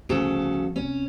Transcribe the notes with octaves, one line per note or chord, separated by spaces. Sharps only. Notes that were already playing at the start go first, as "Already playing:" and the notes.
G1 D2 C#3 F3 A4
C2 C#4